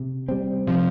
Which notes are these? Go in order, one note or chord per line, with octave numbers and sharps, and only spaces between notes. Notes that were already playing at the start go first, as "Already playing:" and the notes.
Already playing: C3
G3 C4
C3 F3